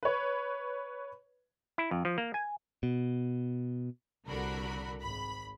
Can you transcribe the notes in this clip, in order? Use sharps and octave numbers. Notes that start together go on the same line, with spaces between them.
B4 C#5
E4
F2
F3
A#3
G#5
B2
C2 D3 F#4 A#4 B5
G#1 B5